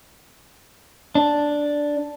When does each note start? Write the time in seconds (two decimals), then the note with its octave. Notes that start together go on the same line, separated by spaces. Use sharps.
1.15 D4